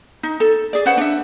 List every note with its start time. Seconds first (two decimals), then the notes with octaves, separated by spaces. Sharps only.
0.23 D#4
0.40 A4
0.73 G#4 D5
0.86 C#4 B4 C5 F#5
0.98 D4 E5